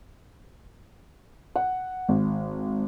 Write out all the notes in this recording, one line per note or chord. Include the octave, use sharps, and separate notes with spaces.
F#5
G#1